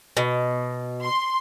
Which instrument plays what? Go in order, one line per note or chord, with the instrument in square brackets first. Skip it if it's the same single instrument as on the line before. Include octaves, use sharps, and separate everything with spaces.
[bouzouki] B2
[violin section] C6